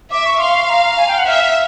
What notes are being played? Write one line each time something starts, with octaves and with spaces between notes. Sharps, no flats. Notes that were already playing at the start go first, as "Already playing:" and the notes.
E5 D6
C#6
F5 C6
A#5
G#5
G5
F#5
E5 F5